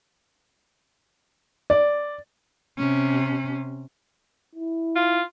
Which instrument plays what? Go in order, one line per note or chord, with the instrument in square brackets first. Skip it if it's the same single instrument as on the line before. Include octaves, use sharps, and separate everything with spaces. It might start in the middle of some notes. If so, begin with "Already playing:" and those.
[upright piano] D5
[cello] C3 C#4
[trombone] E4
[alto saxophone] F4